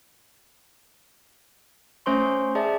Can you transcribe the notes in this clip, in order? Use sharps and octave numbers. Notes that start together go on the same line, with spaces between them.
A3 C#4 C5 C6 C#6
G#4 D5 E5 A5